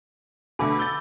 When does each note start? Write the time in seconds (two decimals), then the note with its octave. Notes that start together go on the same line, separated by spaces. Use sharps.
0.59 B2 D3 A3 G#5 B5 D6
0.79 E6 G6 A6 G7